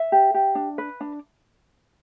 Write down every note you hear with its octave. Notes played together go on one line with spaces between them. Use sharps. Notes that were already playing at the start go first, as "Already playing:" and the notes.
Already playing: E5
G4
G4
D4
B4
D4